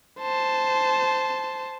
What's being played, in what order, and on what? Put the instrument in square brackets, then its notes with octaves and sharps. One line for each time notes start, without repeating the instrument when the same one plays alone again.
[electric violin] C5 A5